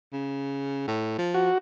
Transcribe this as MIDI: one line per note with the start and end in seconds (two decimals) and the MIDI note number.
0.13 0.87 49
0.87 1.16 45
1.18 1.50 53
1.34 1.58 66